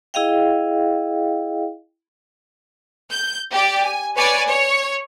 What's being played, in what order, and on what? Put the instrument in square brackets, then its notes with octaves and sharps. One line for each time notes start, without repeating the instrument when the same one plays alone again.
[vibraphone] E4 G#4 D#5 F5 G5
[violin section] G6
G4 D5 G5
G#5
B4 C#5 D5 G#5
C#5